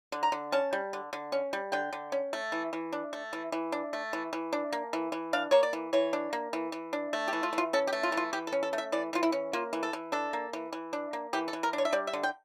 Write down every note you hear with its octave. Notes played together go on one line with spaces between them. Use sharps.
D3
A#5
D3
C#4 A5
G3
D3
D3
C#4
G3
D3 G5
D3
C#4
A3
E3
E3
D4
A3
E3
E3
D4
A3
E3
E3
D4
A#3
E3
E3
D4 F5
A#3 C#5
D5
E3
E3 C#5
D4
A#3
E3
E3
D4
A3
G4
E3
F4
E3
F4
C#4 A4
G4
A3
F4
E3
F4
E3 G4
A4
C#4
A4
A3
E5
E3 D5
E3 F4
E4
C#4
A#3 F4
E3
A4
E3
D4 A4
A#3
E3
E3
D4
A#3
E3 G4
A4
E3
A#4
D4
C#5
E5
G3 D5
E5
D3
G5